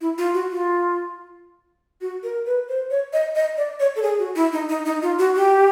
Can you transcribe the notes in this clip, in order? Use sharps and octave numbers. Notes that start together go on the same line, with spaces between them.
E4
F4
F#4
F4
F#4
A#4
B4
C5
C#5
D#5
D#5
D5
C#5
A4
G#4
F#4
E4
D#4
D#4
D#4
F4
F#4
G4